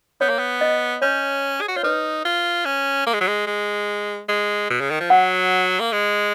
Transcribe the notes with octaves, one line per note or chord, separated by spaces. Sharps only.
B3 C#5
A#3
B3
D#5
C#4 C#5
G#4
F#4
F4 C#5
D#4 B4
F4
C#4
A#3
G#3
F#3
G#3
G#3
G#3
B2
C#3
D#3
F3
F#3 F#5
A#3
G#3